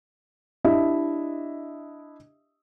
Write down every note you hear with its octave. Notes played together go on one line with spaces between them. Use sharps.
D4 E4 G4 D#5 E5